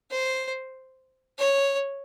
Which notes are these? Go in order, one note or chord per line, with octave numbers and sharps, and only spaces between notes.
C5
C#5